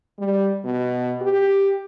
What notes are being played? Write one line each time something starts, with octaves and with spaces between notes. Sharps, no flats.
G3
B2
G4